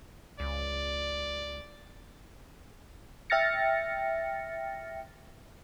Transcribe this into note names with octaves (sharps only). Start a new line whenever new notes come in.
C#2 D5
E5 G5 F6 A6 A#6 C#7